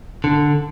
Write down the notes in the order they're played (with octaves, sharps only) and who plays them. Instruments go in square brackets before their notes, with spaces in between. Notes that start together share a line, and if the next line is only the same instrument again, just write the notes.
[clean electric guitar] D3